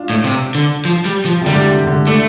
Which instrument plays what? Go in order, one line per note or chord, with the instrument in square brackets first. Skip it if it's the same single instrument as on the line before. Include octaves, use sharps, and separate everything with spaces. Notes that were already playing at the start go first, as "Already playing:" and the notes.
Already playing: [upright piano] D4 F4
[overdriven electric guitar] A2
C3
D3
F3
G3
F3
[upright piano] C3
[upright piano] D3 [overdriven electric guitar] G3
[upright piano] C3
D3
[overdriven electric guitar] A3 [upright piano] D4